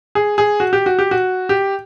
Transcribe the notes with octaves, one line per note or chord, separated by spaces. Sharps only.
G#4
G#4
F#4
G4
F#4
G4
F#4
G4